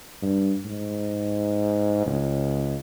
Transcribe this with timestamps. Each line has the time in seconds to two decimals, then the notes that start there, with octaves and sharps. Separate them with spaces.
0.22 G2
0.65 G#2
2.06 C#2